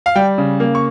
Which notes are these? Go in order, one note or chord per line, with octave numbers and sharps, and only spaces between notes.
F5
G3 G5
C#3
A#3
C#6